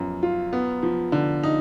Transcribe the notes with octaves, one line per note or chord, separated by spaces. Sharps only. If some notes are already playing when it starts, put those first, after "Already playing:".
Already playing: F#2 F3 B3
F4
B3
F3
D3
D#4